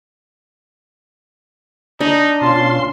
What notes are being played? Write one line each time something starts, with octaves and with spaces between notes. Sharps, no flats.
D4 D#4 B5
B2 C#4 F4 A5 C6